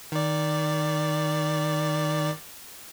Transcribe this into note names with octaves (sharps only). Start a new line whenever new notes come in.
D#3 D5